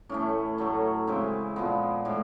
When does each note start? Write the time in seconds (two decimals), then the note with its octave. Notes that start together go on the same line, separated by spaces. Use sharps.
0.09 A2 E3 A3 C#4
0.58 A2 F#3 A3
1.07 C#3 E3 G#3 C4
1.56 A#2 F3 G#3 B3
2.05 A2 E3 G#3